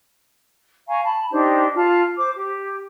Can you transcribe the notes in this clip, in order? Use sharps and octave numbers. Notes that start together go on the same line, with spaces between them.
F5 G#5 A#5 C#6
A5 B5
D4 D#4 G4 C5
F4 A5
C5 D6
G4